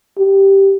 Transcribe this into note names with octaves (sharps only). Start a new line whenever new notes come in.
G4